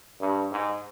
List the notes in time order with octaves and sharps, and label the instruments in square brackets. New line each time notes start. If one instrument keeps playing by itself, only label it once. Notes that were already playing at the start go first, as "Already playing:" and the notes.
[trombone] G2
G#2